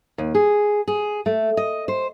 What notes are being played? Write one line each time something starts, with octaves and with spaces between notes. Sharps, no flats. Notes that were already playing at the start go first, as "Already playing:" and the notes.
D#2
G#4
G#4
A3
D#5
C5